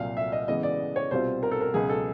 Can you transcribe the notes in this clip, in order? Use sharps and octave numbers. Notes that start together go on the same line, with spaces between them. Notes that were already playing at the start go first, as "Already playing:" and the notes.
Already playing: C2 A#2 F#3 F5
E5
D#5
C#3 E3 G#3 B3 D#5
D5
C#5
C2 B2 G3 C4 F4 C5
A#4
A4
A#4
C#2 B2 F#3 G#4
A4